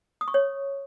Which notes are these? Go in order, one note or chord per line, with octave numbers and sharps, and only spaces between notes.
D#6
C#6
C#5